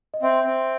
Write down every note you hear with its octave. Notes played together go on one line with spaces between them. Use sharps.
D#5
C4 E5
C4